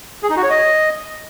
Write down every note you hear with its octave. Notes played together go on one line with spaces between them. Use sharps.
G#4
D#4
F#4
C#5
D#5